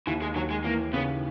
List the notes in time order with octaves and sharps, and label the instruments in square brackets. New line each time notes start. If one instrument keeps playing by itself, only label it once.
[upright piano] D#2 [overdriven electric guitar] E3
[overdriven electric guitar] G#3
[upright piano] D#2 [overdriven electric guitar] F#3
[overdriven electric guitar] G#3
[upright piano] E3 [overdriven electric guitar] A#3
[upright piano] C#3 [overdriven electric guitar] B3